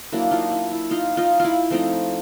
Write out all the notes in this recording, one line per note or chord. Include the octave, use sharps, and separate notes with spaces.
F#3 A#3 D4 E4
D#4 F4
E4
E4
D#4 F4
D#4 F4
E4 F4
F3 A3 C4 D#4